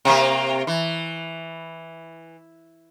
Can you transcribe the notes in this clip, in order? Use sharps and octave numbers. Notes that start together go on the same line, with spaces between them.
C3 A#3
E3